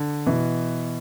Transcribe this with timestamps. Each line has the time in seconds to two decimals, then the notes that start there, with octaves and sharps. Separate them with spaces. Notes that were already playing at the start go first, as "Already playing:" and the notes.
Already playing: D3
0.27 B2 E3